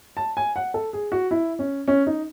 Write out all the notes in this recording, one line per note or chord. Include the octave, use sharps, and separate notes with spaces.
A5
G#5
F#5
A4
G#4
F#4
E4
C#4
C#4
D#4